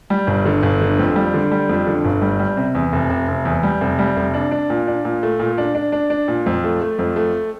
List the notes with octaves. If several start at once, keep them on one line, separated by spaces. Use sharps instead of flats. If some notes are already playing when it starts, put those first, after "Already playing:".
G3
G1
D3
G1
D3
F2
G3
D3
G3
F2
D3
G1
G3
G3
C3
E2
F1
F1
F1
E2
G3
F1
G3
F1
D4
D4
A#2
D4
A#2
A3
A#2
D4
D4
D4
D4
A#2
F2
A3
A3
F2
A3